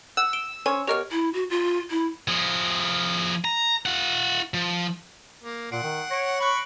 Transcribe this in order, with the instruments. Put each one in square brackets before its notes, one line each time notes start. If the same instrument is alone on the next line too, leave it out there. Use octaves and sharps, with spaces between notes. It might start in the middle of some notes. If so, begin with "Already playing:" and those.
[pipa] F#5 [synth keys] E6
[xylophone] D7 G7
[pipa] C#4 C5 C#5 [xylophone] G#5
[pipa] B2 A#4 C#5 [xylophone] G4 D#5 F6
[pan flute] E4
F#4
F4
E4
[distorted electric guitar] F3 G#4
A#5
F4 F#5
F3
[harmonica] A#3
[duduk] A#2 [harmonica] F#5 [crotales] C7 D7
[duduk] D#3
[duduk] C#5 [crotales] A#6 C#7 D7
[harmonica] B5 C#6 [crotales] F#6 F#7